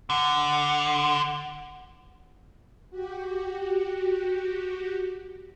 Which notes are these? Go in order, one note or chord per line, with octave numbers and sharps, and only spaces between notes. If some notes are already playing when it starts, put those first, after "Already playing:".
D3 F#5
F#4 G4